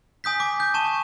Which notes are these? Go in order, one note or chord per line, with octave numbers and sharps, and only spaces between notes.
G#5 D#6 G6 B6
D6
G6
A5 C#6 E7